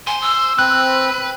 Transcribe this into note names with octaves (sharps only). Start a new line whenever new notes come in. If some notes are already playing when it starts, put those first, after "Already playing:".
C5 G#5
E6
C4 B4 F#6